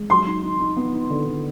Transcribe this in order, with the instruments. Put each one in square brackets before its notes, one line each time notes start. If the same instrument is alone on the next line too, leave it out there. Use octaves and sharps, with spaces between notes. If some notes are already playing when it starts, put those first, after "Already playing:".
Already playing: [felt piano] G#3
[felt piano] F#3 [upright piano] C6
[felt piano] D#4
D#4
D#4
B3
D#4
D3
D3